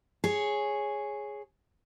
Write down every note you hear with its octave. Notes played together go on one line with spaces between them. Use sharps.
G#4 C#5